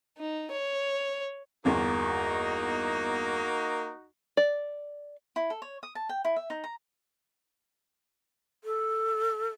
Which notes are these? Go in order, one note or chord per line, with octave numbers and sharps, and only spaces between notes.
D#4
C#5
G1 E2 A#3 D#4 F#4
D5
E4
A4
C#5
D#6
A5
G5
E4
E5
D#4
A#5
A4